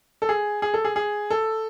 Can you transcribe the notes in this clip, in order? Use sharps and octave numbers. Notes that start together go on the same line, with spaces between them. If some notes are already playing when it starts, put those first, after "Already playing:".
A4
G#4
G#4
A4
G#4
G#4
A4